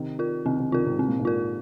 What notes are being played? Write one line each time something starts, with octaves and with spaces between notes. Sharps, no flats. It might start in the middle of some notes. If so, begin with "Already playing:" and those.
Already playing: C3 D#3
F4 A#4
C3 D#3 C4
C3 D#3
C3 D#3 F4 A#4
G#2 C3
C3 C4
A#2
G#2 C3
F4 A#4